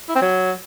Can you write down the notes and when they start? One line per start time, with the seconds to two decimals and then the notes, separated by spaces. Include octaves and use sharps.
0.08 E4
0.15 C4
0.21 F#3